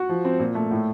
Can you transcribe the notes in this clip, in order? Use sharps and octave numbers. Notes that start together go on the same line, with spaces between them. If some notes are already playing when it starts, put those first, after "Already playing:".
Already playing: F#4
F3
C4
A#2
A3
A2